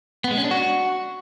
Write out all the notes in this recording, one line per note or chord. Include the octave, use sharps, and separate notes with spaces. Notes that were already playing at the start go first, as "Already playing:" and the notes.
B3
G#3
C#4
D4
F#4